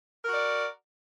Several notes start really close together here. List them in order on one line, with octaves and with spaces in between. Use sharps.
A#4 F#4 D5